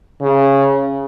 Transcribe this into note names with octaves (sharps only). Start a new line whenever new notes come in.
C#3